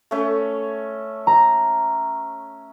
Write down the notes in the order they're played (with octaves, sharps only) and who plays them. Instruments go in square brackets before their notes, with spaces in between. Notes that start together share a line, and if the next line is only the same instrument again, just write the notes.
[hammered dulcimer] A3 C#4
[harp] A#5